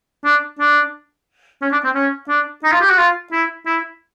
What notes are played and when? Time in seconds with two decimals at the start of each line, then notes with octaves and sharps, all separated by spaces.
0.24 D4
0.59 D4
1.61 C#4
1.72 D4
1.84 C4
1.95 C#4
2.29 D4
2.64 D#4
2.72 F4
2.81 G4
2.89 F#4
2.98 F4
3.32 E4
3.66 E4